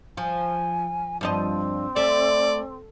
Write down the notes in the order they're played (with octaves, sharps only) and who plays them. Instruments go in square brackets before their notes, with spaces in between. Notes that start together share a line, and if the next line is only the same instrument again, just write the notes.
[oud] F3 [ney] G#5
[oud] G2 F3 D#5 [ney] C4
[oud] A3 [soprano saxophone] D5